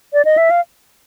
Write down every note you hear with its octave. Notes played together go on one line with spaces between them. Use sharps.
D5
D#5
E5
F5